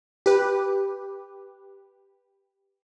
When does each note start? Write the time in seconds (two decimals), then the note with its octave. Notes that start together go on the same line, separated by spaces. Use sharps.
0.26 G4 B4